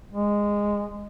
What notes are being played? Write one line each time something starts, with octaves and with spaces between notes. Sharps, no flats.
G#3